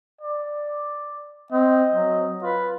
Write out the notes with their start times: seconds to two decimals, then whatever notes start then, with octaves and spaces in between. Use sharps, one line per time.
0.21 D5
1.52 C4 D#5
1.92 F#3
2.42 F4 B4